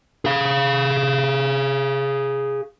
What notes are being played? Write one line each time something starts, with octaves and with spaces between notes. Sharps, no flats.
G#4 F5